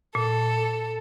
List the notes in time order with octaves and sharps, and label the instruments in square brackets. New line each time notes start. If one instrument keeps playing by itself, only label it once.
[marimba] A#2 [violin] A4